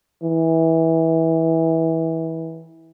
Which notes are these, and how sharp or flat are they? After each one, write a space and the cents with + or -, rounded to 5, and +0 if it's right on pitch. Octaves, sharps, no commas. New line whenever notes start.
E3 -20